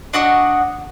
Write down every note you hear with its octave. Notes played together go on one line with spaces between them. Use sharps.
D4 F#4 D#5 F#5